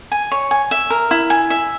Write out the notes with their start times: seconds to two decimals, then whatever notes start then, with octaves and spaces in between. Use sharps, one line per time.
0.12 G#5
0.32 C#5
0.51 G#5
0.71 E5
0.90 A#4
1.11 E4
1.30 G#5
1.50 E5